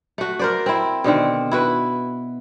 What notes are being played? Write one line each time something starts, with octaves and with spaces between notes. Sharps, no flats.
A3 F#4
A#4 C5 D5
C4 E4
B2 D3 D#3 C4
E4 F#4 B4